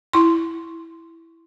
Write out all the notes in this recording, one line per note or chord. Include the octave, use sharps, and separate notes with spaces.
E4 C6